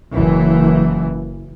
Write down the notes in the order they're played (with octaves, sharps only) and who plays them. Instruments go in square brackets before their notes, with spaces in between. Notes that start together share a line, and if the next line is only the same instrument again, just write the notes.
[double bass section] F#1 E3